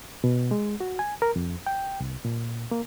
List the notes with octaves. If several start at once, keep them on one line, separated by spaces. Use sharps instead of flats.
B2
G#3
F#4
G#5
A#4
F2
G5
C2
A#2
A#3